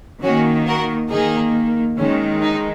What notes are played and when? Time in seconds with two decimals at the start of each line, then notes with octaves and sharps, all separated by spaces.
0.23 D#3 A#3 C#4 F#4
0.67 F#4 A#4
1.11 D#3 A#3 D#4 G#4
1.98 D#3 G#3 C#4
2.43 D#4